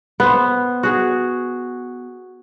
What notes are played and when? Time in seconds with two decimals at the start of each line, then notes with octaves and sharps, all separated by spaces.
0.20 B3 C5
0.83 F#4 G#4